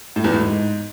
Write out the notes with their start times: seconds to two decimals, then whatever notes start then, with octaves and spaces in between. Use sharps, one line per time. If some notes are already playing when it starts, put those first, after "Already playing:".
0.16 A2
0.24 E2
0.33 A2
0.41 G#2